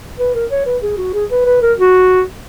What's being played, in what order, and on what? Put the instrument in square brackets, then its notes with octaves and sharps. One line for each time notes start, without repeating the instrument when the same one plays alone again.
[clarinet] B4
A#4
C#5
B4
G#4
F#4
G#4
B4
B4
A#4
F#4